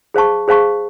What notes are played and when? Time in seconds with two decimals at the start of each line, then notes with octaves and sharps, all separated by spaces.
0.14 G#4 C5 F5 A5 C#6
0.48 G#4 C5 F5 A5 C#6